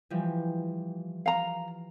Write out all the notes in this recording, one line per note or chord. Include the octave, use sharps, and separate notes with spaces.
E3 F3 G3
F5 A#5